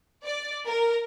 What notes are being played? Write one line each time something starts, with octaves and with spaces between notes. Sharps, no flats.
D5
A#4